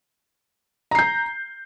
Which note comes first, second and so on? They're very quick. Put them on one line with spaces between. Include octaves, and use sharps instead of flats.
A#5 C7 G6